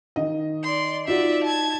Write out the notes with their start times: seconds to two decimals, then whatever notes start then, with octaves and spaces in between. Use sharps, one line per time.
0.16 D#3 D#5
0.63 D5 C6
1.08 D#4 F4 F#4 D5 E5
1.44 A5 G#6